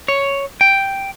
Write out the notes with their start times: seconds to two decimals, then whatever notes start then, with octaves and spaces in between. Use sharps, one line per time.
0.08 C#5
0.61 G5